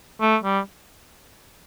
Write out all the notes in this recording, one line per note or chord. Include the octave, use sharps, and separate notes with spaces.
A3
G3